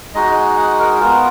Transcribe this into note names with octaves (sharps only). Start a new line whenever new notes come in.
G#3 D#4 F#4 D#5
F#5
A#4
B3 F4 A#4